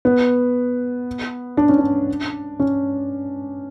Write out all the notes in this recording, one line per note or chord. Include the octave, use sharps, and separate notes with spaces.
B3
D4
C#4
D4
C#4